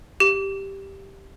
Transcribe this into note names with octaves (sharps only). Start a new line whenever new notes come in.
G4